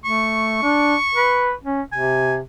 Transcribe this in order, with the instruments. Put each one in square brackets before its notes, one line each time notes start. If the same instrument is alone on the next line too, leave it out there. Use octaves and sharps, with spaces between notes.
[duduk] A3 [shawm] C#6
[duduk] D4
B4
C#4
[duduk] C3 [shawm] G#5